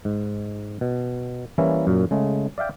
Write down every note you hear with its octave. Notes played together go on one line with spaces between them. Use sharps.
G#2
B2
E3 G3 A#3 C#4 E4
F#2 A#2
C#3 G#3 A3
D5 E5 F5 G5